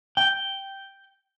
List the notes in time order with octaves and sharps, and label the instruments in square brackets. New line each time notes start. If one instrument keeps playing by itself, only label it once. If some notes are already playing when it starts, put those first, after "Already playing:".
[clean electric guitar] G5